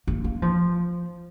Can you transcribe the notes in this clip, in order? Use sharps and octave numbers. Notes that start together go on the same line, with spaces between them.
A#3
A#3
F3